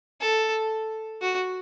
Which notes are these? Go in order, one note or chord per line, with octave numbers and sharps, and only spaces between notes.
A4
F#4